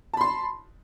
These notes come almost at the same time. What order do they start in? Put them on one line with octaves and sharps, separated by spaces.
A5 B5 C6